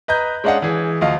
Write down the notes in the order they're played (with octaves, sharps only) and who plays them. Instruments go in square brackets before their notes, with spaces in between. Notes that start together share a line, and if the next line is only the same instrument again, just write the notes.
[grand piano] B4 D#5 A#5 G6
G#3 C#4 D4 D#5 F5 F#5
E3 G#4
D2 F3 D#5 F5